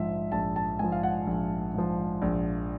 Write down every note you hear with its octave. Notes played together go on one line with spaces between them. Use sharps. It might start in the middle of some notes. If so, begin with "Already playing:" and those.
Already playing: A#1 G#2 F3 E5
A#1 A5
A5
G#2 F3 G#5
F5
F#5
A#1
G#2 F3
A#1